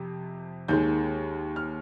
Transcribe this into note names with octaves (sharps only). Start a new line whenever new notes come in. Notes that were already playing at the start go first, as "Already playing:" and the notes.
Already playing: F2 C3
D#2 D#3 G#3 G6
F6